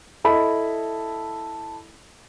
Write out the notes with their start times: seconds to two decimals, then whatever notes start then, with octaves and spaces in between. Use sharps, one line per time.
0.24 E4 A4 D#5 B5